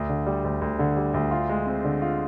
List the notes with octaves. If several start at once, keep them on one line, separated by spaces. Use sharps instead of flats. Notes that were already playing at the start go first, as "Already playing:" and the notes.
Already playing: D2
D3
G3
D2
D2
D3
G3
D2
F4
G#3
C4
D3
F4